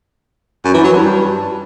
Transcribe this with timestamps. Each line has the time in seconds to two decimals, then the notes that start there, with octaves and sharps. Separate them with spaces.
0.65 F#2
0.74 E3
0.84 F#3
0.93 G2